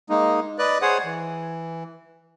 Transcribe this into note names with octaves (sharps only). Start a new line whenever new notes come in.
G#3 A#3 D#4
B4 D5 D#5 F#6
G#4 C5 C#5 F#5 D#6
E3